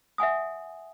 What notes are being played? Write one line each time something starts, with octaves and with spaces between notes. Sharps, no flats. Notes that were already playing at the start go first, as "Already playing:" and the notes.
E5 F#5 G#5 D#6